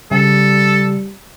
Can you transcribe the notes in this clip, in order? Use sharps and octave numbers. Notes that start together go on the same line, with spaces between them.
C#3 G3 A4